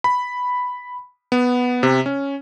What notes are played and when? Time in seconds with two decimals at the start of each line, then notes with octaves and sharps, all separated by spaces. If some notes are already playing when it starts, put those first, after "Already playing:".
0.04 B5
1.32 B3
1.83 C3
2.06 C#4